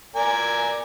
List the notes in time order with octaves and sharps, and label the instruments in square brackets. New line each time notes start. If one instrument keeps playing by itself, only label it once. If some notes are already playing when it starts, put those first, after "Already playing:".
[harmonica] A#4 D5 G#5